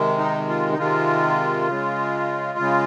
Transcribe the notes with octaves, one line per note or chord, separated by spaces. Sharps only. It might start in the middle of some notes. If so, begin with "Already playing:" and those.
Already playing: C3 D#3 G#3
D#4
F4
D#4
C3 D#3 G#3 F4
C#3 G#3
C#3 G#3